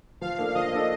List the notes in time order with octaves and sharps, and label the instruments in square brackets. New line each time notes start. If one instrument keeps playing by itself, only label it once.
[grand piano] F3 [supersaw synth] F5
[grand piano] A#3 D4 A4
[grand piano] F3 [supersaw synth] D#5
[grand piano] A#3 D4 A4